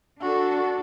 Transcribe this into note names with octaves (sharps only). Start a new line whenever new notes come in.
D4 F#4 A4